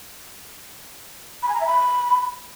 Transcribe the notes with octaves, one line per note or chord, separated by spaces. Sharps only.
B5
G#5
A#5
E5
B5